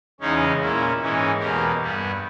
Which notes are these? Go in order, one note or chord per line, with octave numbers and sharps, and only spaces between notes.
E2 C#3 G#3 C#4 D#4
A#2 A#3 C#4 E4
G#2 E3 G#3 C#4
E2 B2 A#3 G4 A#4
G2 G3 B3